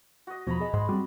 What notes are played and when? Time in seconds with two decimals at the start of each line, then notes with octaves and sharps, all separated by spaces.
0.27 F#4 D#5
0.47 E2 B2 F3 C#5 A#5 B5
0.60 G#4 D#5 A5
0.74 G#2 B5 C6
0.89 G3 C4 F#4